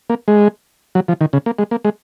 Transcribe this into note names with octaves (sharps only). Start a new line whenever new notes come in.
A#3
G#3
F#3
F3
D#3
C#3
A#3
G#3
A#3
G#3